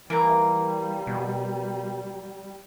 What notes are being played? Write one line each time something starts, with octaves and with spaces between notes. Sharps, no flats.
E3 G3 A#3 A#5
B2